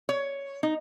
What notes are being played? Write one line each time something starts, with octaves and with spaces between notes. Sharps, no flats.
C#5
D#4